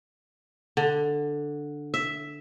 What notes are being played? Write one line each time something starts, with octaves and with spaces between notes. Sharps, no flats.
D3
E5